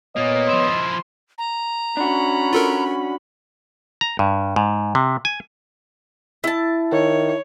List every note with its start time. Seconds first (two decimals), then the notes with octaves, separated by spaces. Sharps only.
0.16 A#2 A#3 B3 C#5 D#5
0.49 F3 E4 C6
1.38 A#5
1.97 C#4 D4 F#4 B5
2.53 F4 A4 A#4
4.01 A#5
4.19 G2
4.56 G#2
4.95 C3
5.25 G#5
6.44 E4 A5
6.92 D#3 C#5